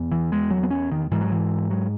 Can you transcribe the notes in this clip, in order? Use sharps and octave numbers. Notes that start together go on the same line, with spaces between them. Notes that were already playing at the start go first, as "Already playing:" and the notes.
Already playing: E2 B2
E3
G#3
F#3
B3
C#4
D#3
G#2 E3
F#3
E3
F#3